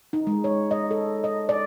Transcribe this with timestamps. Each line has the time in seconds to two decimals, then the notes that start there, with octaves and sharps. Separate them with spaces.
0.13 D#4
0.27 G#3
0.44 C#5
0.71 D#5
0.91 A4
1.24 D#5
1.49 D5